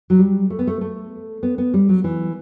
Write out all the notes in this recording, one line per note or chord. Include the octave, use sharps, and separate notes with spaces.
F#3
G3
A3
B3
A3
A3
B3
B3
G3
F#3
E3